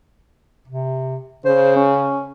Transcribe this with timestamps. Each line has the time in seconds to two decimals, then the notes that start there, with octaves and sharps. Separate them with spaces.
0.68 C3
1.45 C#3 C5
1.76 C#4